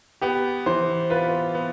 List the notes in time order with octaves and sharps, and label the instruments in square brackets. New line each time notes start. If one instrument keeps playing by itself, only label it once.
[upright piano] B3 [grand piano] G4
[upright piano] E3 [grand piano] C5
[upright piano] F4 [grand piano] B4
[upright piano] B3